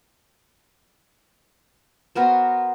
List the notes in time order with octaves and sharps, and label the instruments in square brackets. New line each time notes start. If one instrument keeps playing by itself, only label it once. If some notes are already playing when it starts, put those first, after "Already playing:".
[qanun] B3 F#4 A#4 C5